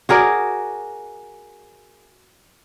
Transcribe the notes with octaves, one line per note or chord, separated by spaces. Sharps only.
F#4 G#4 A#4 D5